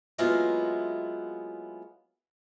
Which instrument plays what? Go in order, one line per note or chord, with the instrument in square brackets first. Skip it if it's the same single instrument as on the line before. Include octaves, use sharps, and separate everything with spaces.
[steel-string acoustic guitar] F#3 G#3 A#3 B3 E4 F4